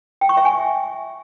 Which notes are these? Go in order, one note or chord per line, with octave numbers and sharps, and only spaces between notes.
G5
C#6
E5
G#5